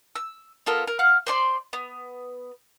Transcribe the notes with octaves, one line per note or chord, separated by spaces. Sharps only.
E6
B3 F4 A4 A#4
A#4
F5 F#5 F6
C5 D5 C6
B3